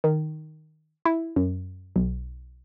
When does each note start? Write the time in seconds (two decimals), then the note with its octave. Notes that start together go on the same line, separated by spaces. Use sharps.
0.04 D#3
1.05 E4
1.36 F#2
1.96 B1